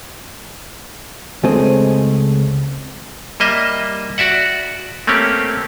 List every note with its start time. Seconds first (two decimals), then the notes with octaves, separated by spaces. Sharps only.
1.43 C#2 G#3 A3 C4 G#4 D#5
3.40 G3 A#3 D#5 E5
4.18 F#4 D5 E5 F#5
5.07 A3 A#3 C4 C#4 G4